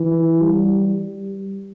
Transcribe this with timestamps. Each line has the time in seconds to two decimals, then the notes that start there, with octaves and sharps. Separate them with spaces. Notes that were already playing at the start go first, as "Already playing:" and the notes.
Already playing: E3
0.41 G3